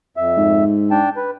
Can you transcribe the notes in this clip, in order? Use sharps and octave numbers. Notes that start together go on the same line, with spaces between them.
F2 E5
G#2
D4 G5 A5
B4